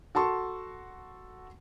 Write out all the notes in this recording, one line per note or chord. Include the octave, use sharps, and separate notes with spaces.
F#4 A4 A5 C6 C#6